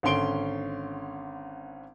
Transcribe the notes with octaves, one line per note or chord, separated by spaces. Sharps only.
G#1 D3 C#4 C6 D7 G7